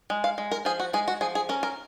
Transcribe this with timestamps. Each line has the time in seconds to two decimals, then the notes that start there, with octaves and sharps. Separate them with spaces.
0.10 G#3
0.24 F5
0.38 G#3
0.51 A#4
0.65 F3 G#4
0.79 F#4
0.93 G#3 G#4
1.08 F#4
1.21 F3 G#4
1.35 G#4
1.49 C#4 A#4
1.63 A#4